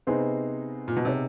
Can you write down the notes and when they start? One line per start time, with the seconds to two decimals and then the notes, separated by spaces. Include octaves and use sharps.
0.07 C3 B3 D#4 G#4 C5
0.88 A#2
0.96 B2
1.05 C3 B3 D#4 G#4 C#5